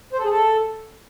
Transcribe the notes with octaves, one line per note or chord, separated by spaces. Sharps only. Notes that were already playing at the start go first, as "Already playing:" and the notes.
C5
A4
G#4
A4